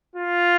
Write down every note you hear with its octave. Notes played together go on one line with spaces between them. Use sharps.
F4